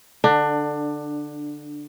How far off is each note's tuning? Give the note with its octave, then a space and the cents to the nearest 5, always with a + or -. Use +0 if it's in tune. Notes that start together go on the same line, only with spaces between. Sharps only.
D3 +0 D4 +20